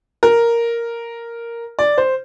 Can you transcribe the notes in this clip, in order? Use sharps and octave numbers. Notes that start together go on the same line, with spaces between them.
A#4
D5
C5